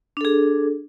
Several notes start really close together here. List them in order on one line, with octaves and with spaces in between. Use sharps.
D4 A4 G#4